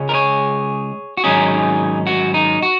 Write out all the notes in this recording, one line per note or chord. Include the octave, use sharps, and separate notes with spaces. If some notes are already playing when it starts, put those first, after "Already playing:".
Already playing: C#2 C#3 G#3 C#4
A#4
G#4 C#5
F#4
G#2 D#3 F#3 C#4 D#4 G#4
F#4
D#4
F#4